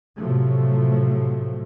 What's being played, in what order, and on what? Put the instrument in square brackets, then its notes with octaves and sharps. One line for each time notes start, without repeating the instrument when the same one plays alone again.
[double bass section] A2 C3 F3 F#3 A3